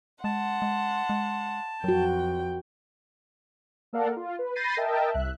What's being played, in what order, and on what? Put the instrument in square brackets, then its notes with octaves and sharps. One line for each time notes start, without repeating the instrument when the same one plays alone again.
[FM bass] G#3 [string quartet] F#5 C6 [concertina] A5
[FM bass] G#3
G#3
[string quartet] F2 G5 [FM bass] F#3 [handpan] F#4 A#4
[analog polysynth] A#3 A4 A#4 D5 F5 F#5
F4
B4
B5 G6 A6 A#6 C7 D#7
A#4 D#5 E5 G5 A5
C2 E5 F#6